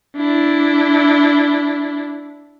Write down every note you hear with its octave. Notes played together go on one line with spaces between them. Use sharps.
D4 E4